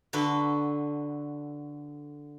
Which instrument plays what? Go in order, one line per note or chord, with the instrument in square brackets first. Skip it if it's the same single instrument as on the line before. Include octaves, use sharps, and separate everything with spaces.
[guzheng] D3 F#4 A4 B4